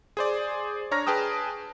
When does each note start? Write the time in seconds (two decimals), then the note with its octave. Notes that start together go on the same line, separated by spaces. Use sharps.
0.17 G#4 C5 D5
0.91 D4 C#5 A#5 F6 A#6
1.07 G#4 B4 G5 A5 D#6